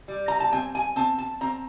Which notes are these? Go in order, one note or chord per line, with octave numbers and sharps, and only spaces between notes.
G3
A#5
A5
C4 G#5
G#5
C4 A5
A5
C4 A#5